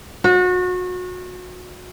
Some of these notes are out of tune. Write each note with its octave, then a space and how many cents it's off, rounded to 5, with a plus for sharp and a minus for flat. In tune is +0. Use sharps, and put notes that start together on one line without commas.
F#4 -30